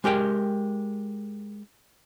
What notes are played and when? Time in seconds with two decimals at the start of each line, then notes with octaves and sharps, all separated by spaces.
0.04 G#3 G4 A#4 G5